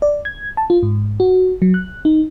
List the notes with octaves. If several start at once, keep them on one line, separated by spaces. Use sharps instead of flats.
D5
G#6
A5
F4
G#2
F#4
F#3
F#6
D#4